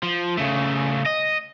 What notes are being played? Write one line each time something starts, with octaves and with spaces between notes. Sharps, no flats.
F3
C#3 A3
D#5